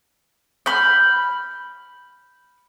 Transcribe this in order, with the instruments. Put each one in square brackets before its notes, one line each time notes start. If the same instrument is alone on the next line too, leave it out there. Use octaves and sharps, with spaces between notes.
[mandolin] B5 F6 G6